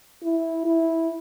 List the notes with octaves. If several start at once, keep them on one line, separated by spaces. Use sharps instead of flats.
E4
E4